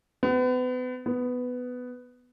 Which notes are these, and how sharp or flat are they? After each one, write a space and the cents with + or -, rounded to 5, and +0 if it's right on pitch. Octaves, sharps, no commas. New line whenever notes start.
B3 +35
B3 +10